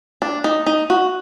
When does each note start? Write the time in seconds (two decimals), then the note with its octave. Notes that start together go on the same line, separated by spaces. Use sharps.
0.22 D4
0.44 D#4
0.66 D#4
0.90 F#4